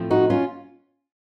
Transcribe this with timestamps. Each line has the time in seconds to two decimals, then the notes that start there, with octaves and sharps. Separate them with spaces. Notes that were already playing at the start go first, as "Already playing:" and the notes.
Already playing: A2 F3 C4
0.10 D#4 F#4
0.30 C#4 F4